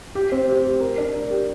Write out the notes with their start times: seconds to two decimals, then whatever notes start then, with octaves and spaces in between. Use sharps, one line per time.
0.15 G4
0.32 C4
0.49 G4
0.65 G4
0.80 A#4
0.98 D4
1.14 A#4
1.30 G4